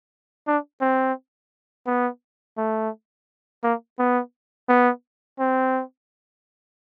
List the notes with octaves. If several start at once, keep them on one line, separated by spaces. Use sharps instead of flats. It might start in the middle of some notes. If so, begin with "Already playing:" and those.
D4
C4
B3
A3
A#3
B3
B3
C4